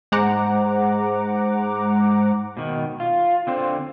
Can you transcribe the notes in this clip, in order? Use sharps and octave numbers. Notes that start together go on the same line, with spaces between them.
G#2 G#3 C5 F#5 A#5 D6
B2 D#3
F4
D3 C4 C5